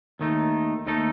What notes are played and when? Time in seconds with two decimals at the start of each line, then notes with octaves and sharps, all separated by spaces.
0.19 D#2 D#3 A3 D#4
0.87 D#2 D#3 A3 D#4 A4